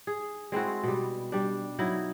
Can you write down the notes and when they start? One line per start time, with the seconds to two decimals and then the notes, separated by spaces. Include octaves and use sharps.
0.07 G#4
0.52 G#3 C4 E4 F#4
0.83 B2 G3
1.32 G3 D4
1.79 F#3 D#4 E4